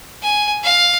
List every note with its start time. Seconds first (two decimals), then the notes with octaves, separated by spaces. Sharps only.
0.22 G#5
0.64 F5